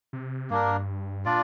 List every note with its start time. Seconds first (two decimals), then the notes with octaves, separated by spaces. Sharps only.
0.13 C3
0.50 G2 A#3 D4 A#4
1.25 A#2 D4 F4 D5